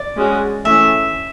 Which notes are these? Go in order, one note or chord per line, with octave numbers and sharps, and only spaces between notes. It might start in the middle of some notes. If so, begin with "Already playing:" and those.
Already playing: D5
G#3 C#4 F#4
E3 A3 C#4 E5